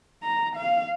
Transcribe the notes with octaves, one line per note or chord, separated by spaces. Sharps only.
A#5
F5